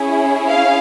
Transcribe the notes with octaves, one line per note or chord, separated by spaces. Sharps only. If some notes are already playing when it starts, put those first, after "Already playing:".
Already playing: C#4 E4 G#4
F5